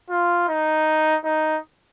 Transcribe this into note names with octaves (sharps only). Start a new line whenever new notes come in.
F4
D#4
D#4